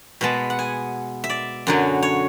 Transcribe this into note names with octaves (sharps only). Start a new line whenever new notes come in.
B2 G#3 B3 A5
F#5
G#5
E5
D5
F#2 D3 F#3
C#5